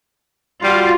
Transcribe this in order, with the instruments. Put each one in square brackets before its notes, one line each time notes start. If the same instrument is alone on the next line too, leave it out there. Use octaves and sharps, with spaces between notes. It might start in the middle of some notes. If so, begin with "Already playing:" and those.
[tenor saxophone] G3 [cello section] F4 F#4